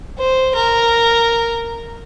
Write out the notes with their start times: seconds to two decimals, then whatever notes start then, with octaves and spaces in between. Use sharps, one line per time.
0.18 C5
0.55 A#4